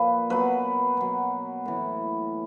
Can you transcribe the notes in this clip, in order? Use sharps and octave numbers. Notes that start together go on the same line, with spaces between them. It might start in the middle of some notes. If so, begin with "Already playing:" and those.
Already playing: A#2 F3 B4
B2 F#3 B4
B2 F#3
A2 E3